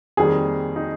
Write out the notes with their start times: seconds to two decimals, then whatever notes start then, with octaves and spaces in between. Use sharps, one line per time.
0.17 F2 D#3 G3 A#3 G#4
0.76 D#4